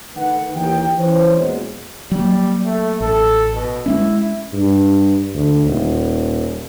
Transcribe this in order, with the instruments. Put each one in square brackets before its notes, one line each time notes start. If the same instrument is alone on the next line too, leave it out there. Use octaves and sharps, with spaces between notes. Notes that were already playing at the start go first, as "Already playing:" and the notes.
[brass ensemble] D#3 A3 B4 F#5
D#2 E3 D#4 G4 G5
E3 C#4 C5
E2 A#2 F#3 G#3
[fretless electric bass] F#3 A#3 [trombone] G3
[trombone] A3
[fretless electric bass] A1 [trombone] A4
[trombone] B2
[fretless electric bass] G#3 A#3 C#4 [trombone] E4
[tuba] G2
D2
D#1